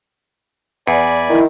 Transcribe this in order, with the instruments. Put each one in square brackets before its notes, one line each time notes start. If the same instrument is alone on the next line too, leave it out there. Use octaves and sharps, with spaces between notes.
[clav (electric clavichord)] E2 [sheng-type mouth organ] D5 G#5 B5
[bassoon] D#3 [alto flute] E4